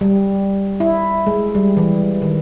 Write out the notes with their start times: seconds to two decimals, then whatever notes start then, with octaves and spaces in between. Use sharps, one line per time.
0.01 G3
0.80 E4
1.27 G#3
1.55 G3
1.77 E3
2.22 D#3